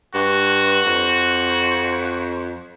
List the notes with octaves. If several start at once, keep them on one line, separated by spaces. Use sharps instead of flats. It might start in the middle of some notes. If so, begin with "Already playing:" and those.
G2 F#4
F2